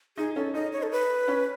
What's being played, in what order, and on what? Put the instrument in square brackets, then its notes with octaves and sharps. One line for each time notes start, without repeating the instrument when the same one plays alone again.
[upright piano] D#4 [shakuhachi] G#4
[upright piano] C#4 [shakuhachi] A4
[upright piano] D#4 [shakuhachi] D#5
[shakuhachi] C#5
A4
B4
[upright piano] C#4